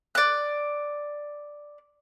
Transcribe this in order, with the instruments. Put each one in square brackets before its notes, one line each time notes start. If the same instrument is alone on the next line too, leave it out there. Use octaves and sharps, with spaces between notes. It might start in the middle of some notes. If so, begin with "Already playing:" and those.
[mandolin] D5 F#6